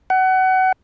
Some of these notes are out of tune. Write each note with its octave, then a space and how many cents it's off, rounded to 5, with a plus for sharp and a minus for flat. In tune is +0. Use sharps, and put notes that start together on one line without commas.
F#5 +25